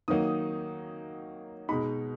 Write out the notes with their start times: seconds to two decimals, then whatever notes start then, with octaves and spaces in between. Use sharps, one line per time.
0.08 D#3 F#3 A#3 D#4 D#6
1.69 B2 G#3 D#4 B5